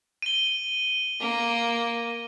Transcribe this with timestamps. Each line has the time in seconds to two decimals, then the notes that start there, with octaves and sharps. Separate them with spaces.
0.22 D#7 G7
1.20 A#3